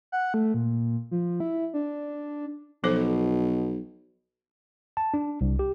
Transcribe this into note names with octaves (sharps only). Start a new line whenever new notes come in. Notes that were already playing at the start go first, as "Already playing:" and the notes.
F#5
A3
A#2
F3
E4
D4
B1 B2 F3 A4 C5
A5
D4
C2
G4